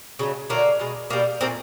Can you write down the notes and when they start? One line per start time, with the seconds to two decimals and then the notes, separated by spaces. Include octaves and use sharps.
0.19 C#3 F#3 A3
0.49 D3 F#3 A3 A#3
0.79 B2 G#3
1.10 B2 G3 A#3
1.41 F3 A3 A#3 C4
1.46 A#2